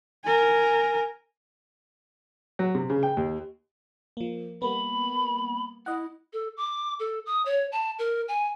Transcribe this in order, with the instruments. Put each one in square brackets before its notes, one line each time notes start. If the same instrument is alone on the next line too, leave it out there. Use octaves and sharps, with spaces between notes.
[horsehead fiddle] A#4 G#5
[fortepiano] F#3
C3
C#3
G5
D#2
[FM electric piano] F3 A#3
[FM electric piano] G3 A#3 B3 [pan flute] B5
[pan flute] E4 [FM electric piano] D#5 F#5
[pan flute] A4
D6
A4
D#6
C#5
A5
A#4
G#5